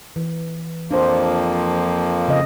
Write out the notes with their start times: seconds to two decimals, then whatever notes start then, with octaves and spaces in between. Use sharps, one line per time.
0.16 E3
0.91 F2 F3 A#3 D4 C5
2.28 C#3 D#5